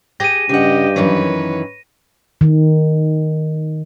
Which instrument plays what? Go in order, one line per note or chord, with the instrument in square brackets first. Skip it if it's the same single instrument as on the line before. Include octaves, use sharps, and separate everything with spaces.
[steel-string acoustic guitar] G4 G#4 G5 [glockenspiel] A#6 D#7
[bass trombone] G2 [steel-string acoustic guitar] C#3 F#5 [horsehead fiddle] G4 D#5
[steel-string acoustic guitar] F#2 D#3 E3 [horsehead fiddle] B4 C#5
[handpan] D#3